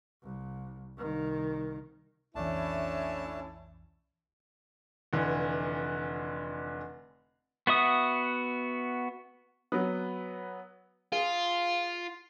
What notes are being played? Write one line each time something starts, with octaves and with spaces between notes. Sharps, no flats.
C2
C2 D#3
B1 F2 E3 A3 C#4 D4 E4 A5
F1 D3 E3
B3 F#4 E5 D#6
F#3 B3
F4 G#4